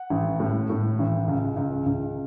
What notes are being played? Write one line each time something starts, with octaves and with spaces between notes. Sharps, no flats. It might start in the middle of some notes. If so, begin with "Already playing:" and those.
Already playing: F#5
A1
A2
A2
A1
C#2
C#2
C#2